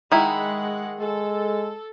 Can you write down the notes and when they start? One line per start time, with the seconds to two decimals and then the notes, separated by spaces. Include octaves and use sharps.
0.12 D#3 G#3 E4 F#5
1.00 G#3 A4